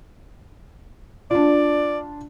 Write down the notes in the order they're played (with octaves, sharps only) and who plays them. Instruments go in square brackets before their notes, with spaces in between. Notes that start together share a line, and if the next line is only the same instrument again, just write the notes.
[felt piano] D4 F4 [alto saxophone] D5